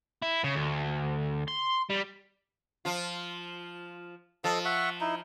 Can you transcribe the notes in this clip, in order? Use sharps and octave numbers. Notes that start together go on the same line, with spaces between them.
E4
C#3
D2
C6
G3
F3 F4
F3 A4 D#5 A5
E5 F#5 C#6
D#4 E4